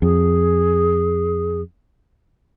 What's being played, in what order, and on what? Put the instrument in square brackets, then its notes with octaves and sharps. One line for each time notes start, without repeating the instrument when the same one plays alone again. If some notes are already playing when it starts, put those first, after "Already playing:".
[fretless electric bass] F2 [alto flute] G#4